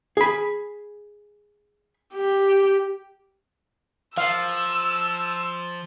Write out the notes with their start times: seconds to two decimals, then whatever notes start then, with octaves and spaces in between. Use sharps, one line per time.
0.17 G#4 B5
2.15 G4
4.18 F3 F5 E6